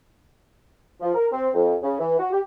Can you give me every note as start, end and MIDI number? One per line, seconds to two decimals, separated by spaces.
1.01 1.12 53
1.14 1.26 70
1.31 1.49 60
1.54 1.75 41
1.83 1.96 49
1.99 2.17 52
2.19 2.29 66
2.32 2.40 67